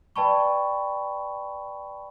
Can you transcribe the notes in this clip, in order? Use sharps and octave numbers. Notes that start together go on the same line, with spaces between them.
B4 D5 G5 A5 B5 C#6